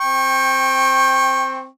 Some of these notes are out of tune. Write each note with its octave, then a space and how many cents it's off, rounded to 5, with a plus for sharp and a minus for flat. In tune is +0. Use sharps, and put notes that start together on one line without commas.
C4 +0 G5 +15 C#6 -25